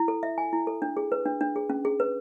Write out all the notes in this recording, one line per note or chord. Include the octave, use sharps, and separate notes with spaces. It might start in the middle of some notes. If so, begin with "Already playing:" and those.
Already playing: E4
A4
E5
G#5
E4
A4
D4
G#4
B4
D4
D4
G#4
C#4
G#4
B4